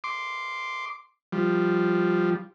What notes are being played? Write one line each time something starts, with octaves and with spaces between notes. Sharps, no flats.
C6 D6
F3 G3